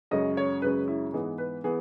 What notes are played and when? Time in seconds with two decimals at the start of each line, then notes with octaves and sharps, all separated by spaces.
0.11 F#2 C#3 G#3 C#4 D#5
0.37 C#5
0.62 F#2 C#3 G#3 C#4 B4
0.88 E4
1.14 G#2 E3 B3 G#4
1.38 B4
1.64 E3 B3 G#4